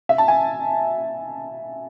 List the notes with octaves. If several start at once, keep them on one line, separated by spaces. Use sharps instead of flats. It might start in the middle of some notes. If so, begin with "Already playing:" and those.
E5
A5
G#5